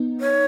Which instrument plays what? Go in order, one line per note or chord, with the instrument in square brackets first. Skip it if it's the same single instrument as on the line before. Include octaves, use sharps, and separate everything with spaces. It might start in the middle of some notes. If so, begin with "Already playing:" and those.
Already playing: [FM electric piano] B3 D#4
[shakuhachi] C#5